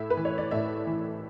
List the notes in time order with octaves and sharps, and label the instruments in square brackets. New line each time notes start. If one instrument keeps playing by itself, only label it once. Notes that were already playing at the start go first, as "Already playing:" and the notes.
Already playing: [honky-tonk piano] A2 E5
B4
E3
C#5
D5
A2 E5
E3